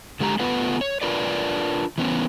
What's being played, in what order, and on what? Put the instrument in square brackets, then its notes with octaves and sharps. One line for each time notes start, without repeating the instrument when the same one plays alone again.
[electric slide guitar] D3 G#3 G4 D5 A#5
A3 B3 F4 B4 F#5
C#5
D4 F4 A#4 B4 D5
E3 B3 C#4